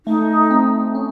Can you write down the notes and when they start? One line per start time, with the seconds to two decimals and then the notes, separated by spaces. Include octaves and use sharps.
0.06 A3 D#4
0.50 C4
0.95 C#4